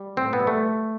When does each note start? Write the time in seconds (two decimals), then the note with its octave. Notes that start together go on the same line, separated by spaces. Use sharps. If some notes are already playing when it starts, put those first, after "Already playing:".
Already playing: G3
0.17 A2 C4
0.33 B3
0.40 G3
0.47 A3